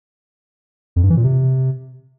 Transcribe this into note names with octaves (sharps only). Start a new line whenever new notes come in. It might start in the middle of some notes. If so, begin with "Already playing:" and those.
F2
G2
E3
A#2
C3